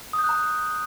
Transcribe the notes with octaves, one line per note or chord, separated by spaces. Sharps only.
D#6
G6
F#6
A#5